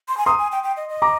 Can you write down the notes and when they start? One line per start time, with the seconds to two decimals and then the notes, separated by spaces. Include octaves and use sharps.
0.08 C6
0.17 G#5
0.26 A#5 C6 D#6
0.39 G#5
0.52 G5
0.63 G5
0.77 D#5
0.89 D#5
1.02 A#5 D6